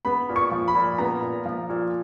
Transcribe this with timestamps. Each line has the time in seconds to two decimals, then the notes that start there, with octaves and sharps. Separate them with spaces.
0.05 B3 B5
0.29 A#2
0.36 C#6
0.52 F3
0.68 B5
0.75 A#2
0.98 B3 A#5
1.22 A#2
1.46 F3
1.69 A#2